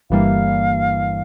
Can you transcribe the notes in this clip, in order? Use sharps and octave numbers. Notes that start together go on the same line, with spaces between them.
G1 G2 E3 G3 A#3 F5